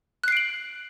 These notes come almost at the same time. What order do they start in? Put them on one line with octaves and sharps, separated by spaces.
F#6 C7 D7 F#7